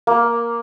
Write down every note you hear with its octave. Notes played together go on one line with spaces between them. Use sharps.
A#3